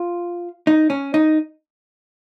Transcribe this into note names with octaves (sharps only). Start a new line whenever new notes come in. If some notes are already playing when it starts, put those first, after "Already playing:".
Already playing: F4
D#4
C#4
D#4